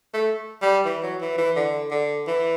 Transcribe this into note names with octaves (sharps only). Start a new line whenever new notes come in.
A3
G3
E3
F#3
E3
E3
D3
D3
E3